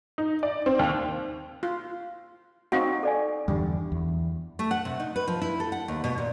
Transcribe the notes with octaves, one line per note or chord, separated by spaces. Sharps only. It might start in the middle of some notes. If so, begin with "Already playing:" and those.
D#4
D5
C4
D#2
F4
C4 D#4 F#4 F5 F#5
A4 D5 G#5
E2 G2 D3 G3
E2
A3
F#5
C3
D#4
B4
F3
E4
A4
F#5
D#2
B2
A#2